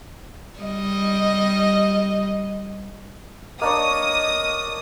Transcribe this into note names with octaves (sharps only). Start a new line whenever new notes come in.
G3 D#5
A#3 D4 C#5 D#5 D#6